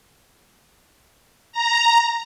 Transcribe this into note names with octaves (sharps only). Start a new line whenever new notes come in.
A#5